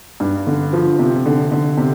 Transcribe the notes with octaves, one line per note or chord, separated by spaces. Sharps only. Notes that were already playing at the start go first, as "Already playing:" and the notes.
G2
D3
F3
C3
D3
D3
C3